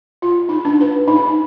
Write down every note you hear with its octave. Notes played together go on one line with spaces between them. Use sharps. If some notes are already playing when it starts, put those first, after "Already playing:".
F4
D#4
D4
B4
D#4